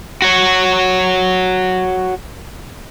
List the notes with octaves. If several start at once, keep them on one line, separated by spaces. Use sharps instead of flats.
F#4 C#5